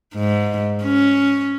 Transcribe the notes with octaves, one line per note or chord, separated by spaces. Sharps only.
G#2
C#4